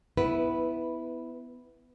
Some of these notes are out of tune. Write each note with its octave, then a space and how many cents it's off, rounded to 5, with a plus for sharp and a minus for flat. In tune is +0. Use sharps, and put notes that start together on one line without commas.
B3 +15 E4 -5 B4 +0